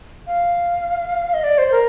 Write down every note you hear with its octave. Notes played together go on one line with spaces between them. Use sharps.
F5
D#5
D5
C5
A#4